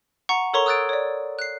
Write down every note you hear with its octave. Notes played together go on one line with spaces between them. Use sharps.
F#5 A#5 C#6
A4 A#4 C#5 A#5 C6 C#6
D#6 E6 F#6 G#6 A6 D7
C#5 D5
F#6 C7